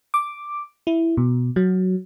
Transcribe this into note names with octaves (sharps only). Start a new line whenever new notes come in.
D6
E4
B2
F#3